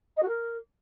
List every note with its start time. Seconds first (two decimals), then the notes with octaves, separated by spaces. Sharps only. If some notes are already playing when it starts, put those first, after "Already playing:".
0.17 D#5
0.22 F#4
0.28 A#4